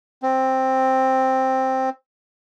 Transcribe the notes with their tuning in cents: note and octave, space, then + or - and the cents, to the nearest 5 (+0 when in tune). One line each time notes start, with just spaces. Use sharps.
C4 +5